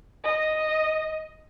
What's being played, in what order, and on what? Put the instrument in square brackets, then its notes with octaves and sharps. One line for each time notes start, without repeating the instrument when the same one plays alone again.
[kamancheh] D#5